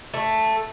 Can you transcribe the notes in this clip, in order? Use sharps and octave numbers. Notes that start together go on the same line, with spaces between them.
A3